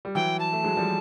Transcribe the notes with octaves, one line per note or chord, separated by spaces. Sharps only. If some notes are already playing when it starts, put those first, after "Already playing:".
G3
E3 F#3 G5
A5
A3
F#3 G#3
F3 G3